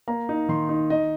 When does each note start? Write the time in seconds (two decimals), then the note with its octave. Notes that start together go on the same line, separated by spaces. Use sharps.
0.08 A#3 A#5
0.29 D#4
0.49 D#3 C6
0.69 D#4
0.90 D#4 D#5